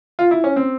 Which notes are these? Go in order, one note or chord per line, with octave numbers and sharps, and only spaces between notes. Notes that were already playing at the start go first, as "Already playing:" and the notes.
F4
E4
C#4
C4